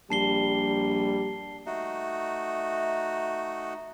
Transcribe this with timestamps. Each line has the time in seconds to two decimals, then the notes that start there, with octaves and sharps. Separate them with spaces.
0.10 A#1 G3 A5 C7 G7
1.66 A3 D#4 F#4